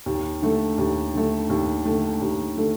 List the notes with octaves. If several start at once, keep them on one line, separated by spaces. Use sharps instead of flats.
D#2
D3 A3
D#2
D3 A3
D#2
D3 A3
D#2
D3 A3